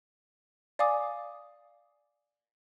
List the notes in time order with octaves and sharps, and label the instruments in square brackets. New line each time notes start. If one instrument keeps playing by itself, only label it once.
[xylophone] D5 F5 G#5 D6 D#6